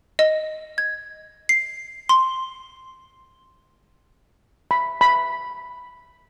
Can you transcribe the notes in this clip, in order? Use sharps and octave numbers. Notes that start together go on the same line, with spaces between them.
D#5
G#6
C7
C6
B5
B5